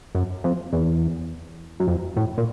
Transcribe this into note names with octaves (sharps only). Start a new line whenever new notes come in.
F#2
F2
E2
F#2
F2
A2
A#2